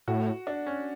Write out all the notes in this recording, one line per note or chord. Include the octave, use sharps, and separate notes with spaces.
A2 F#4
D4
C#4